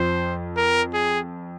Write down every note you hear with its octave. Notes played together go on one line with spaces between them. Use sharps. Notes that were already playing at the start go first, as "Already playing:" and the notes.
Already playing: F2 F3 C5
A#4
G#4